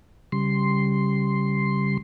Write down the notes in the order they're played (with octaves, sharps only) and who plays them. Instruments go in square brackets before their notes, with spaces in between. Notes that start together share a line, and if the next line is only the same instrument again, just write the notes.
[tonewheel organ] C#3 G3 C6